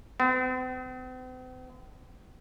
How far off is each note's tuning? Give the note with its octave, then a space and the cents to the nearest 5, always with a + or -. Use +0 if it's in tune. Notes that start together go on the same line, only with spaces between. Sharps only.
C4 -45